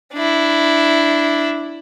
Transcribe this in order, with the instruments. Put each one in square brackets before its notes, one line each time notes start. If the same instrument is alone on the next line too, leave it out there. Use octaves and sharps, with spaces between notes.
[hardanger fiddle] D4 E4